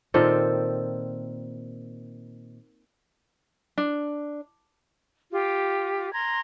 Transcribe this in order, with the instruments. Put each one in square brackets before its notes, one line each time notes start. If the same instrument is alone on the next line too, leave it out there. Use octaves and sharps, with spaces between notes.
[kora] A#2 D#3 C4 A4
[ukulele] D4
[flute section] F4 G4
A#5 C6 G#6